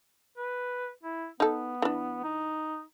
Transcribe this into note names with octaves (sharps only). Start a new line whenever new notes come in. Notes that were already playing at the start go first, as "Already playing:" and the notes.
B4
E4
B3 D#4 A4
E3 D4
D#4